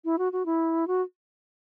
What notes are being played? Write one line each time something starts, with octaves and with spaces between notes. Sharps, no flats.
E4
F#4
F#4
E4
F#4